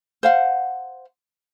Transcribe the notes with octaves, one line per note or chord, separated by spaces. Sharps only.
C5 F5 F#5